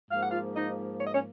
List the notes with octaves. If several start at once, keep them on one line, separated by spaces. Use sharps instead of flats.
G#2 F3 A#3 F5
F#5
F4 F5
D#4 D#5
C#5
D#5
C#4 C#5